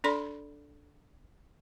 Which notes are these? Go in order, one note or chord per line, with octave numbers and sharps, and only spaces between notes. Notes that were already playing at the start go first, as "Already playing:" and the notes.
D4 A4 D5 B5 C6